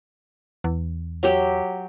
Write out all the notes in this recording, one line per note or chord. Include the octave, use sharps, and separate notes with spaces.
E2
F#3 G4 G5